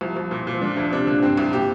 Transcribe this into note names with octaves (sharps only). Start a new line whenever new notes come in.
C2 F3
C2 F3
A#2
A#2
F3
D3 D4
D2 F3
C3 D4
A#2 D3
G2 C4
C2
A#2 G4